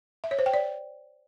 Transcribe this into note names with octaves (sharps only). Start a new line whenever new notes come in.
E5
C#5
C5
G5
D5